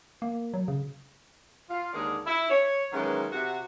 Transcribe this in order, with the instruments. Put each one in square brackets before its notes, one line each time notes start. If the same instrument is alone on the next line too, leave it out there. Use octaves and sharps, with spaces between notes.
[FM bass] A#3
F#3
C#3
[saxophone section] F4
D#2 D3 G#3 G#4 A#4 D5
E4
C#5
D#3 E3 F#3 G#3 B3 C#4
C3 F#4